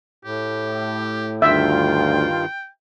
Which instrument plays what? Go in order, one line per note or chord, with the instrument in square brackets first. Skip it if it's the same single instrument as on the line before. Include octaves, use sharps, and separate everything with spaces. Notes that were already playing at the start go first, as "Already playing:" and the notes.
[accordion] A2 [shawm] G4
[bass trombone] D2 [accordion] G2 D#3 F4 [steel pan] E5 [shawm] G5